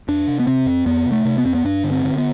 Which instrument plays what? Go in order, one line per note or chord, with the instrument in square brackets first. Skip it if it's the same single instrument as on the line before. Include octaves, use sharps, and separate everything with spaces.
[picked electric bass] F2 D4
C3
B3
C3 C4
F2
F2 B3
C3
A3
C3
B3
F2 C4
B3
G2 D4
D3
C4
D3
B3